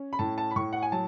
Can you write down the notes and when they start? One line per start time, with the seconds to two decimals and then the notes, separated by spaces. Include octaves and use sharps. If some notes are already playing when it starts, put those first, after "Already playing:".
Already playing: C#4
0.13 B5
0.19 A2 A5
0.38 A5
0.51 B5
0.56 A2 C#6
0.73 F#5
0.82 G#5
0.92 F#3 A5